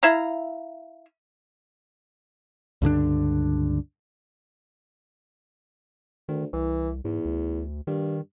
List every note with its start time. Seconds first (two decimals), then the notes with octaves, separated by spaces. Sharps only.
0.03 E4 E5 F5 A#5
2.82 C#2 G2 D3 D4
6.29 D2 D#3
6.53 C2 E3
7.04 E2 G#2
7.25 D2
7.87 G2 D#3